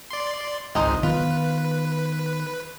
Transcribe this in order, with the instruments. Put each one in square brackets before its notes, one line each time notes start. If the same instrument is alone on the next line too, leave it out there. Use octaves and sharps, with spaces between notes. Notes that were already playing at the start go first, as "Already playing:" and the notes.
[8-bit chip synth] D5 C6
[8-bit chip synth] G#1 C#2 [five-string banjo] G#3 D#4 C5
[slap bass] D#3 B3 [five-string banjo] F4 [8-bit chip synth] B4